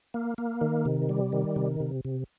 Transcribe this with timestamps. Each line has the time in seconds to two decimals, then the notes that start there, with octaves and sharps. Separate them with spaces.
0.14 A#3
0.38 A#3
0.61 D#3
0.85 C3
1.09 G3
1.32 D#3
1.56 C3
1.80 C3
2.05 C3